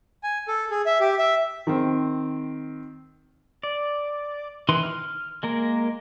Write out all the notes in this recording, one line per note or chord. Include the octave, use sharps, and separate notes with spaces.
G#5
A4
G#4
E5
G4
E5
D#3 C4
D5
D#3 E3 D#4 B4 C6
F6
G#3 A#3 A#4